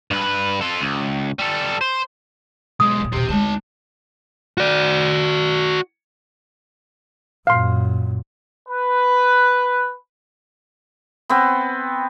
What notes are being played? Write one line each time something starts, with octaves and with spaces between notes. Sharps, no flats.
G2 B4
F4 A4
C#2
G3 A4
C5
B1 G#3 D#6
D#2 A#2
D#2 B2 G4 C5
D2 G#3 D#4 A5
F#4 D5
F#2 A#2 F5 C6
B4
B3 C4